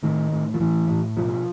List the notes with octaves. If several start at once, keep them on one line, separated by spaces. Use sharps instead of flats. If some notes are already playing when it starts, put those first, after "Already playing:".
A2 D#3
A2
F3
A2 E3
A2
B2 F3